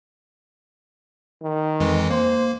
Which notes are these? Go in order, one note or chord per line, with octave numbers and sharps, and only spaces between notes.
D#3
F2 E3 G#3
A#3 C5